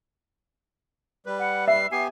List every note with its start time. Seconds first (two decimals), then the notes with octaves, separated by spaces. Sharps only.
1.26 G3 B4
1.39 F#5
1.68 E5 C7
1.92 B3 G4 G#5 C7